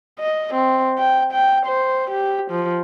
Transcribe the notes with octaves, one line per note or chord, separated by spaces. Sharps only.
D#5
C4
G5
G5
C5
G4
F3